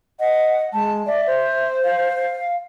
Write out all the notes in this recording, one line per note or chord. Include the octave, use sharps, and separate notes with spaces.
D#5 F#5
G#3 A5
D5 E5
C5
F5